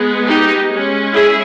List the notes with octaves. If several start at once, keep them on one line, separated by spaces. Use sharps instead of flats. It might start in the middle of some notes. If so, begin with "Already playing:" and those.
Already playing: G#3 B3
D#4 G4
G#3
C#4
E4 G#4